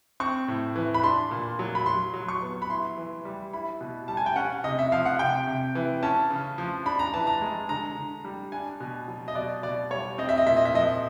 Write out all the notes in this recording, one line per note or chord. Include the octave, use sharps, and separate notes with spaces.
C4 C#6
A2
E3
B5
D4 C6
A#2
F#3
B5
F#3 C6
F#3
C#6
B3
B5
E4 C6
E3
G3
E4 B5
B2
G3 A5
G#5
G5
C#4 F#5
C3 D#5
E5
F3 F5
F#5
C3 G5
C3
E3
C#4 A5
C#3
F3
D4 B5
A#5
E3 A5
A#5
G#3
D3 A#5
D3
G3
D4 G#5
B2
F#3
D#5
B2 D5
B2 D5
G3 C#5
C4 D#5
E5
D#5
A#2 E5
D#5
E5
F3 D#5